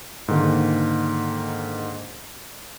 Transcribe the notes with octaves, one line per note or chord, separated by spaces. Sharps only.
G#2 D3 D#3 G#3 A#3